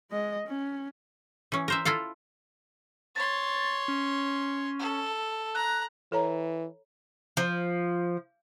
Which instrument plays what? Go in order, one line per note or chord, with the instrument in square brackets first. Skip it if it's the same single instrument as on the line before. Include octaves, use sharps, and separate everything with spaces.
[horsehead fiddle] G#3 D#5
C#4
[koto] E3 C#4
A#4 C5 E5
E4 F4 A4 F5
[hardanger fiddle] C#5 C6 [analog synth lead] A6
[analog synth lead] C#4
[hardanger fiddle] A4
[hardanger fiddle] A#5 [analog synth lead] F#6
[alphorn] E3 [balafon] A4 C#5 A#5
[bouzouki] F3